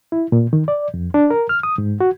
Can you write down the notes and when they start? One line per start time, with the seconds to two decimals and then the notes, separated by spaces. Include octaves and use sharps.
0.12 E4
0.32 A#2
0.53 D#3
0.68 D5
0.94 F2
1.14 D4
1.30 A#4
1.49 F6
1.63 D#6
1.78 G#2
2.00 F#4